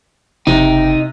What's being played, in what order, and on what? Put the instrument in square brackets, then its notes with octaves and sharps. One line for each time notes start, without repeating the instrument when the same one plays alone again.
[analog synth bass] F#1 [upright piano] C3 [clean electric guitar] D#4 [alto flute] G5